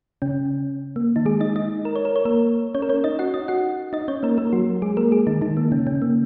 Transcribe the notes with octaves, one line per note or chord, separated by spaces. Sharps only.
C#3 C#4
A#3
D#3 D#4
G#3 G#4
D#4 D#5
D#4 D#5
A#4
C#5
A#4
C#5
A#3 A#4
C#4 C#5
A#4
C#4 C#5
D#4 D#5
F#4 F#5
D#4 D#5
F#4 F#5
D#4 D#5
C#4 C#5
A#3 A#4
A#3 A#4
F#3 F#4
G#3 G#4
A#3 A#4
G#3 G#4
D#3 D#4
D#3 D#4
A#3
C#3 C#4
C#3 C#4
A#3